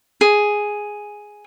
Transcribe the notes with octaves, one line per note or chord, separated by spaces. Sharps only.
G#4